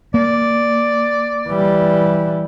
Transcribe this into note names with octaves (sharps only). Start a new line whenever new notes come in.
A#3 D5
E3 G3